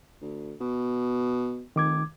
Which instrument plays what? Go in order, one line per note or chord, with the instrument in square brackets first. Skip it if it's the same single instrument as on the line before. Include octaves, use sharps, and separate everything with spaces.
[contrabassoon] D2
B2
[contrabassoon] F1 [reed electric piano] D#3 D6 G#6